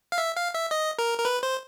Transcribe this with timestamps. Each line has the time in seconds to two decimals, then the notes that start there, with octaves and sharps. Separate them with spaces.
0.12 F5
0.18 E5
0.36 F5
0.54 E5
0.71 D#5
0.99 A#4
1.18 A#4
1.25 B4
1.43 C5